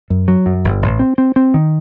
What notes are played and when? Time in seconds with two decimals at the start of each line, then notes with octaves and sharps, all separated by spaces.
0.10 F#2
0.28 F#3
0.46 F#2
0.64 G1
0.82 A1
0.99 C4
1.18 C4
1.36 C4
1.54 D#3